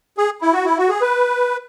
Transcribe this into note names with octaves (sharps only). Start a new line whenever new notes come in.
G#4
E4
F#4
E4
F#4
G#4
B4